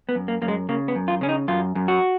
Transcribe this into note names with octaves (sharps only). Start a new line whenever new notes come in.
B3
F#2
A#3
F#2 A#3
G#3
C#3 A#3
B3
F#2
F4
C#3 C#4
D#4
F#2 F4
F#2
F#4